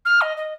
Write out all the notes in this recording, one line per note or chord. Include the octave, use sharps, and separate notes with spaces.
F6
D#5
D#5